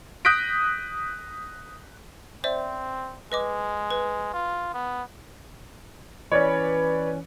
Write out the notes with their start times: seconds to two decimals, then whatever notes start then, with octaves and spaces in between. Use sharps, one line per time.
0.25 D#6 F#6 G6 A#6 B6 D7
2.44 C4 C5 D5 E5
3.32 G#3 B4 D#5 D6
3.91 B4
4.33 F4
4.74 B3
6.32 E3 C#4 B4 C#5 D5